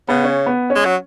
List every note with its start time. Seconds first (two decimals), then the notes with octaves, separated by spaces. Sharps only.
0.09 C#3 B3
0.24 C#4
0.46 B3
0.70 C#4
0.75 G#3
0.85 F#3